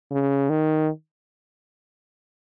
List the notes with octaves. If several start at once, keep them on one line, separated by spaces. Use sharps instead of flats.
C#3
D#3